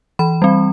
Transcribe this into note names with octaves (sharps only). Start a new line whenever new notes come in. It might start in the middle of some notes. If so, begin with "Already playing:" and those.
E3 B5
G3 C4